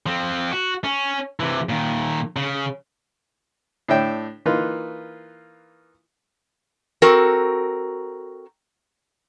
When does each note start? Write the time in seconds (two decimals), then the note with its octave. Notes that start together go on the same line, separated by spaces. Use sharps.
0.06 F3 C4
0.52 F#4
0.84 C#4
1.40 C3 E3
1.69 A#2 D#3
2.36 C#3
3.88 A2 D4 E5 G5
4.46 E3 A#3 D#4 F4 B4
7.02 C4 F#4 A4 A#4